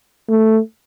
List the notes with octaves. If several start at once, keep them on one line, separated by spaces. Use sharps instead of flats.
A3